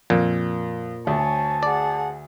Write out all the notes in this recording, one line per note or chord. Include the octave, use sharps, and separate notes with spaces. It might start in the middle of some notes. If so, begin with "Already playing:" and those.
F2 A#2
D2 C#5 G#5 A5
G#4 D5 F#5